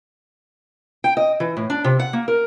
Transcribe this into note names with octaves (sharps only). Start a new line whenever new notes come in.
G5
D#5
E3
A2
D4
C3
F#5
A#3
A#4